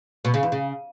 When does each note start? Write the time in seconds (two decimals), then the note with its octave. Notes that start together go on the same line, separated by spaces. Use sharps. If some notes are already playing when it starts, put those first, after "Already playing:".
0.25 B2
0.34 C#3
0.43 E2
0.52 C#3